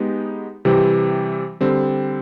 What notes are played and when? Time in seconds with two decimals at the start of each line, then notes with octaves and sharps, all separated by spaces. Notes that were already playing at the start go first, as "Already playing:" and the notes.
Already playing: G#3 B3 D#4 G4
0.65 C3 E3 G3 C4
1.61 D3 G3 C4